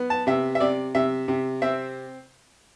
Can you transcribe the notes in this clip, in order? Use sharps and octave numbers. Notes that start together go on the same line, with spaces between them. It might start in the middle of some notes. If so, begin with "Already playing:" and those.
Already playing: B3
A5
C3 E5
E5
C3 D5
C3 E5
C3
C4 E5